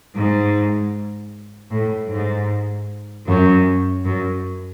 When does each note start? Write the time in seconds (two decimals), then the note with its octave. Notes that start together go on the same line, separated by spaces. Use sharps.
0.16 G#2
1.71 A2
2.11 G#2
3.28 F#2
4.06 F#2